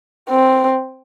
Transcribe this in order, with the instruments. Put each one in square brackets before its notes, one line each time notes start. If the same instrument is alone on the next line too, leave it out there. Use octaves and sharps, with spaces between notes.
[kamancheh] C4